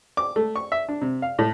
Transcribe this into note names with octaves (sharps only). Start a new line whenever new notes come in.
D6
A3
C#6
E5
D4
C3
F5
A2